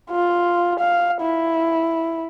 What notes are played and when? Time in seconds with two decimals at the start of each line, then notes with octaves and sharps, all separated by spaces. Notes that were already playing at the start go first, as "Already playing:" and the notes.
0.11 F4
0.80 F5
1.22 E4